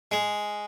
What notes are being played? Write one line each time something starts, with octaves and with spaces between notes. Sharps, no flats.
G#3